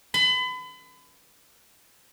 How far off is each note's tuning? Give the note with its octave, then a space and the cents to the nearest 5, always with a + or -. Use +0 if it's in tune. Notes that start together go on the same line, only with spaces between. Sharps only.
B5 +35